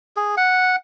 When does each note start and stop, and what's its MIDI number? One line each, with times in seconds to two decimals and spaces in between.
0.16 0.35 68
0.37 0.76 78